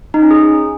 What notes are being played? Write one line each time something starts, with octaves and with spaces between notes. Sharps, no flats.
D#4
C#4
G#4